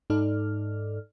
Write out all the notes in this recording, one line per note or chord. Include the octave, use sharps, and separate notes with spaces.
G#2 D#4 A4 D5 F6